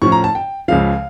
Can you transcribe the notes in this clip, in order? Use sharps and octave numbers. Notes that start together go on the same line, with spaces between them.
A2 F3 C#4 C#6
A#5
A5
G5
C#2 C#3 F3 F5